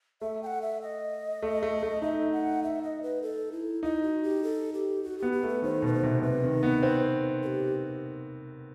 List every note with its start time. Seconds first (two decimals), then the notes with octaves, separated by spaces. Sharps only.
0.21 A3 E5
0.43 G5
0.46 F#5
0.62 E5
0.82 D#5
1.42 A3
1.63 A3
1.83 A3
2.02 D#4 E5
2.32 F#5
2.63 E5
2.83 D#5
3.02 B4
3.22 A4
3.52 E4
3.83 D#4 E4
4.02 F#4
4.23 G4
4.43 A4
4.73 G4
5.03 F#4
5.18 B3 G4
5.32 G4
5.43 A3 B4
5.62 D#3 C5
5.82 B2 B4
5.93 C5
6.03 C3
6.22 C3 B4
6.44 D#3
6.63 B3
6.83 C4
7.43 A4
7.46 G4